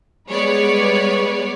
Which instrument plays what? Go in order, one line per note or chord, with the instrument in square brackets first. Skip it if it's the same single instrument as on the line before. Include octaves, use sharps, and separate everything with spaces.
[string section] G3 G#3 B3 B4 C#5 D5